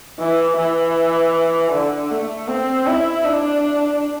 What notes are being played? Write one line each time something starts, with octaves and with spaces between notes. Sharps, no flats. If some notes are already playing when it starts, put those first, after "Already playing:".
E3
E3
D3
A3
C4
E4
D4